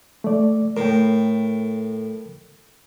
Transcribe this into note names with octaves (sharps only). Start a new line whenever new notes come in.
A3 D5
A2 A#4 G5